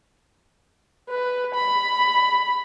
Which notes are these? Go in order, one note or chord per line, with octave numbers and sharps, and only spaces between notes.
B4
B5